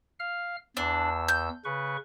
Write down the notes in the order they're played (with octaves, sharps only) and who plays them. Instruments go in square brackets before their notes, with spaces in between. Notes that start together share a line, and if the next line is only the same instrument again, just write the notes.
[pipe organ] F5 F6
[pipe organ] E2 E6 [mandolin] D4
[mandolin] G6
[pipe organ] C#3 B4 C#6